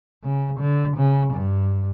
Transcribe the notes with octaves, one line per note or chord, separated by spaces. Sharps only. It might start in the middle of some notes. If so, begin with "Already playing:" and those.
C#3
D3
C#3
G2